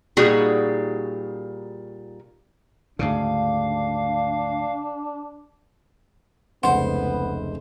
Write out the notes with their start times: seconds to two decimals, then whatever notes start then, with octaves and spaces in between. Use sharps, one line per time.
0.17 A#2 G3 D#4 F#4 G#4
2.99 D2 G#2 C#3 D4 F5
6.63 F1 C#2 B3 C5 F#5